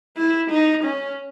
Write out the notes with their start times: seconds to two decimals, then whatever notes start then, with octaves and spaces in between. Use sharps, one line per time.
0.17 E4
0.51 D#4
0.84 C#4